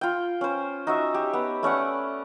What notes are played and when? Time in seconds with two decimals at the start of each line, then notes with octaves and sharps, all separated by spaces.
0.01 F4 G5
0.41 C#4 C5
0.87 D#4 F#4 E5
1.14 G4
1.33 B3
1.63 A3 C#4 D5 F#5